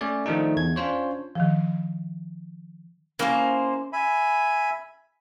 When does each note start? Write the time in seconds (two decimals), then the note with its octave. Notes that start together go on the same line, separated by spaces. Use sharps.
0.01 A3 C#4 C#5 D5
0.26 D#3 F3 A3 D4 D#4
0.57 E2 G#6
0.76 C#4 D4 F4 C5 C#5
1.35 D#3 F3
3.19 A#3 C#4 E4 C5
3.93 E5 G#5 B5